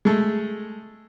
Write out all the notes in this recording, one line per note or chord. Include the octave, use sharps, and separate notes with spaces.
G#3 A3